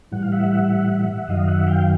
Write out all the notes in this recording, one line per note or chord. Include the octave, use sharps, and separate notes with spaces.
A2 E3 G3 F#5
F5
E5 F#5
F#2 D#3 F#3 D#5 F5
E5 F#5
F5 G5